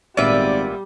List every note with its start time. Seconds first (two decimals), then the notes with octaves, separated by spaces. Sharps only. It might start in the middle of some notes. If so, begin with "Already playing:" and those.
0.17 G#1 A#2 G3 B3 D5 E5